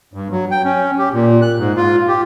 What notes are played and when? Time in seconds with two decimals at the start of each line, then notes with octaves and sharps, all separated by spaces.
0.14 G2
0.31 F#3
0.51 G5
0.64 C#4
0.99 G4
1.13 A#2
1.42 F#6
1.59 G#2
1.77 F4
2.08 G4